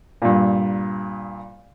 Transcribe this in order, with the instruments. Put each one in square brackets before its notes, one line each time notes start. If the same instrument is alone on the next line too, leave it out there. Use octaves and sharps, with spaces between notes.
[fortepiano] G2 A#2